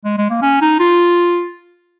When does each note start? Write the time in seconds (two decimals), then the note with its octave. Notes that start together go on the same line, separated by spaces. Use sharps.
0.05 G#3
0.18 G#3
0.30 A#3
0.42 C#4
0.61 D#4
0.80 F4